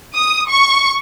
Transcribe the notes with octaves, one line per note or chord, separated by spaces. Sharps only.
D#6
C#6